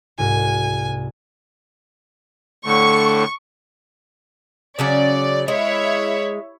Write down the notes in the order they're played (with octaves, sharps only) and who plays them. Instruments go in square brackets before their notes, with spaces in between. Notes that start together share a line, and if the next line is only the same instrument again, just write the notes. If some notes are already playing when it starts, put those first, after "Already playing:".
[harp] C2 G#2 F#4 [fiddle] G#5
[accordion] A2 D3 A3 [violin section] C#6
[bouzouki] C#3 F#3 C#4 [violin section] D5
[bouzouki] G#3 [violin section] E4 C#5 E5